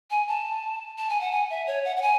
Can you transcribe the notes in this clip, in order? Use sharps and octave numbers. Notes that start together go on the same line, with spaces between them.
G#5
A5
A5
G#5
F#5
G#5
E5
C#5
F#5
F#5
G#5